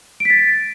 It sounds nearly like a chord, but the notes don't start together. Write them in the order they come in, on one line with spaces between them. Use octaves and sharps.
D7 B6 A6